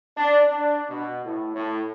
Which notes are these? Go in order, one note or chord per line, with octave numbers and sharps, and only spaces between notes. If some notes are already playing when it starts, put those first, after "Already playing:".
D4
D4
B2
A2
A2